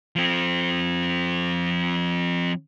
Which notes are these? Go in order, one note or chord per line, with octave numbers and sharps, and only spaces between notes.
F3 C4